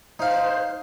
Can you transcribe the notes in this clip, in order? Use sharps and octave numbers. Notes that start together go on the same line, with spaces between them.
D#4 C5 F5